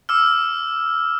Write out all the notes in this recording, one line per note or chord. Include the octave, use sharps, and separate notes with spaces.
D6 E6 F6